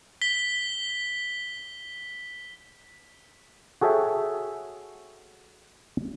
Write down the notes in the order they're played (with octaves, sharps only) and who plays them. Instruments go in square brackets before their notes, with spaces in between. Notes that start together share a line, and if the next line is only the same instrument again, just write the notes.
[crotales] B6 G7
[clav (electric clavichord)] F#4 G#4 A4 C#5 E5 G5